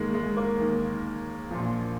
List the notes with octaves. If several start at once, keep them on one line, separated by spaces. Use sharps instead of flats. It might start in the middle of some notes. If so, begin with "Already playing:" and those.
Already playing: D#2 D#3 G#3 A#3
G#3
A#3
D#2 D#3
A#1 A#2 F3